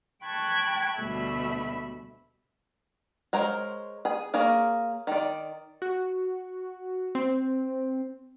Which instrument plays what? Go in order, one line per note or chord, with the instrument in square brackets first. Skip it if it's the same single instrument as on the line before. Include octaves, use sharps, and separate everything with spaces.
[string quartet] G5 A5 B5 C#6 F#6 G#6
D2 B2 G3 A3 E5 B5
[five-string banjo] G#3 A#4 C5 C#5
G#4 G#5
A#3 G#4 A#4 C#5
D#3 D5
[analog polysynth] F#4
C4